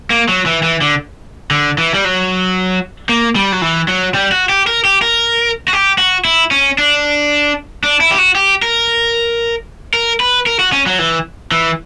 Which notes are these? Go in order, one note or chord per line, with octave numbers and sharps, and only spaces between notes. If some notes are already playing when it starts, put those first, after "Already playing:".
A#3
F#3
E3
E3
D3
D3
E3
G3
F#3
A#3
G3
F#3
E3
F#3
G3
F#4
G4
A#4
G4
A#4
F#4
G4
F#4
E4
C#4
D4
D4
E4
G4
F#4
G4
A#4
A#4
B4
A#4
F#4
C#4
F#3
E3
E3